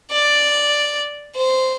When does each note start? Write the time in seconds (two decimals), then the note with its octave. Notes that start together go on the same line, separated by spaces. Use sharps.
0.12 D5
1.36 C5